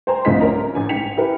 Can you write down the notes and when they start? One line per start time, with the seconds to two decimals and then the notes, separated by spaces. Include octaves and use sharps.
0.07 C5 G5 G#5 A#5 C6
0.25 C2 F2 A3 F4 D#5 B6
0.41 C#4 A#4 A#5
0.75 A1 G#5
0.89 G#2 G5 G#5 B6 C#7 F7
1.17 E4 G4 A#4 B4